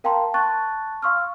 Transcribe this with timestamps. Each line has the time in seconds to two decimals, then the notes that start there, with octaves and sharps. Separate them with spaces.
0.04 A#4 F5 G5 A5 A#5 C6
0.34 A5 C#6 F#6 A6
1.02 F5 C6 C#6 E6 F6